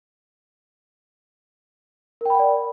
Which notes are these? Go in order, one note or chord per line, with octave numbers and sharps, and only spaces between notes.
A#4 D5 F#5 G5 B5